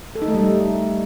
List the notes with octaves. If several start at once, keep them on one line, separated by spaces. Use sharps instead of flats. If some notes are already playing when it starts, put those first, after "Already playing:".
A4
D#4
A3
G3